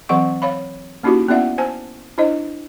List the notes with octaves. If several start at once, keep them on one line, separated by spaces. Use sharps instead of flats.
E3 F#3 C4 F#5 C#6
C#5 F5 B5
A#3 C#4 D#4 E4 F#4 G4
B3 C#4 E4 D5 E5 F#5
C5 G#5 A5
D4 E4 C5 D#5